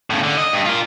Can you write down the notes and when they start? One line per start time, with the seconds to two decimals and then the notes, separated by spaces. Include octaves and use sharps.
0.10 A2 C#3
0.24 D3
0.38 D#5
0.53 G2
0.66 F4 A#4